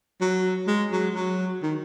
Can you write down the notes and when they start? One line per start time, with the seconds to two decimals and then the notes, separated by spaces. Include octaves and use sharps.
0.21 F#3
0.67 G#3
0.92 F#3
1.15 F#3
1.63 D#3